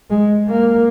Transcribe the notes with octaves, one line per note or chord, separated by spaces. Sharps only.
G#3
A#3